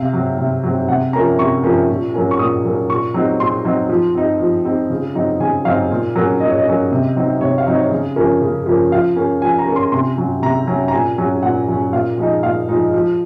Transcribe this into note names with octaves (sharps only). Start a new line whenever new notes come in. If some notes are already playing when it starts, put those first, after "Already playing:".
Already playing: C3 F5
F#3 C4
C3
F#3 C4
C3 F#5
F3 A#3 C#4 A#5
C3 C#6
F3 A#3 C#4
A#2
F#3 A#3 C#4
C#6
A#2 D#6
F#3 A#3 C#4
A#2 C#6
F#3 C4 D#4
A#2 C6
F#3 C4 D#4
F3
C4 D#4
F3
C4 D#4
C#3
F#3 C4 D#4
C#3 G#5
F#3 C4 D#4 F5
A#2
F#3 A#3 C#4
A#2 D#5
C#5
D#5
F#3 A#3 C#4
C3
F#3 C4 D#4
C3 C#5
F5
F#3 C4 D#4
C#5
C#3
F3 A#3 C#4
C#3
F3 A#3 C#4
F3 F5
A#3 C#4
F3 G#5
A#5
A#3 C#4
C6
C3 C6
F#3 C#4
C3 A#5
F#3 C#4
A#5
A#2 G#5
F#3 C#4
A#2 F#5
F#3 C#4
A#2 F5
F3 G#3 D#4
A#2 F5
F3 G#3 D#4
F3